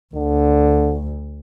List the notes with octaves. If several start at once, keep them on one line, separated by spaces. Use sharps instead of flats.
D2 D3